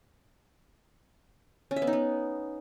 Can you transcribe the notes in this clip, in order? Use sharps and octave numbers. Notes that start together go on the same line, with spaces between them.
C#4
E5
B3
D#4
B3